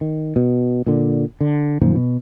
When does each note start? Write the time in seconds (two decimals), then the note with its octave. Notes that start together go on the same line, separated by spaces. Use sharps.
0.01 D#3
0.36 B2
0.86 A#2 D3
1.41 D3
1.81 F#2 A#2 D#3 F3
1.95 B2